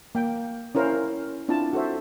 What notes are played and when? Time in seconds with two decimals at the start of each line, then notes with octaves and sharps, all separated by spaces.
0.15 A#3 G5
0.75 C#4 E4 A#4 C5 F5
1.49 C4 D4 E4 F4 A5
1.73 F#4 A4 C5 E5